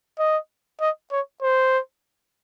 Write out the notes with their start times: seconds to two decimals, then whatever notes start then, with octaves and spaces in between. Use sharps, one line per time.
0.19 D#5
0.81 D#5
1.11 C#5
1.42 C5